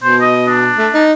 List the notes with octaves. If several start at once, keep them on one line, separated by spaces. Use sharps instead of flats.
B2 C5
D#5
D4
A3
D#4